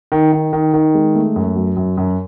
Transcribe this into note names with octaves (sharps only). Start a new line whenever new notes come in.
D#3
D#3
D#3
D#3
G#3
A3
F#2
F#3
F#2
F#2